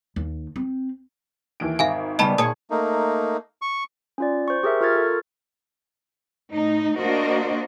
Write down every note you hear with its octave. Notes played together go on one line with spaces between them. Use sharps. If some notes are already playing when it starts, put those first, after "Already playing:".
D#2
C4
D#2 E3 D7
G#1 E5 F5 G#5
C#3 G3 B3 D#5 A5 B5
A#2 G#4 C#5 A5 D#6
A3 A#3 D#4
C#6
C#4 F4 D5
C5 C#6
G4 G#4 A#4 E5
F4 A#4 C#6 F6 G#6 A6
A4
A2 D#4
A#3 D4 F#4 A#4 C5 D#5